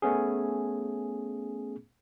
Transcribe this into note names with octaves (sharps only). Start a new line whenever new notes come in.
A3 B3 C#4 G#4